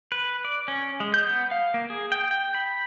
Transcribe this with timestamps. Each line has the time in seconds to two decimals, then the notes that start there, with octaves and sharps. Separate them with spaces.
0.12 B4
0.45 D5
0.68 C#4
1.00 G#3
1.14 G6
1.27 B3
1.51 F5
1.74 A#3
1.90 G#4
2.12 G5
2.31 G5
2.55 B5